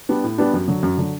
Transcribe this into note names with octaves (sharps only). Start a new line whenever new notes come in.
G3 B3 D4
A2
G3 B3 D4
F#2
D3 F#3
F#2
D3 F#3